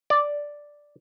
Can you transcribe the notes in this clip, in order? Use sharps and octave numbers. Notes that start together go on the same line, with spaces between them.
D5